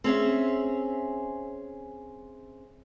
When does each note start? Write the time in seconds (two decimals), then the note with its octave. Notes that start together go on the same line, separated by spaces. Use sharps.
0.04 C4 C#4 G#4 E5